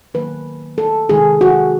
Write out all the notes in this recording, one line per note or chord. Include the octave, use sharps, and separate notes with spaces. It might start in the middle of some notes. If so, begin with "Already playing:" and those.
D#3 F#3 A#3 B4
A4
C3 D#3 G#3 G#4
F#4